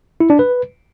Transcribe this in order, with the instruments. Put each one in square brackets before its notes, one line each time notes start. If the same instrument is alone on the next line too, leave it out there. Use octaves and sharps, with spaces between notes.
[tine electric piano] E4
D4
B4